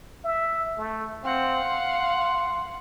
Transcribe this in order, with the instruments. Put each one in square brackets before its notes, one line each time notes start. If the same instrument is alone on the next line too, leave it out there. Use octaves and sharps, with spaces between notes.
[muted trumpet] E5
A3
[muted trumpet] C4 [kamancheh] F5 F#5
[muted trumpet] C6